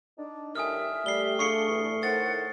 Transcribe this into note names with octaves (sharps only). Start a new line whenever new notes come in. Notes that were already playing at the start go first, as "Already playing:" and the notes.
D4 D#4
A2 D#3 G3 E5 G#5 D#6 F6
G3 A3 C7 G7
D4 F4 G#4 C#6 C7 C#7
E2 G2
A2 D#3 C5 F#5 A6